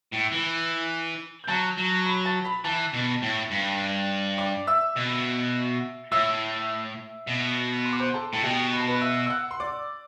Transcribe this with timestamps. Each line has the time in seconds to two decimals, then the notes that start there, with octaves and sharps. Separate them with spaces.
0.13 A2
0.32 E3
1.44 G6
1.48 F#3 A5 A6
1.77 F#3
2.06 B5 B6
2.25 A5 A6
2.45 B5 B6
2.64 E3 A5 A6
2.93 B2
3.22 A2
3.51 G2
4.38 D5 D6
4.67 E5 E6
4.96 B2
6.12 A2 E5 E6
7.27 B2
7.85 C6
7.93 D6
8.00 C5 C6
8.14 A4 A5
8.33 A2 A5
8.43 B2 G4 G5
8.73 B5
8.80 A5
8.87 B4 B5
8.96 F#6
9.01 E5 E6
9.26 E6
9.30 F#5 F#6
9.51 C6
9.60 D5 D6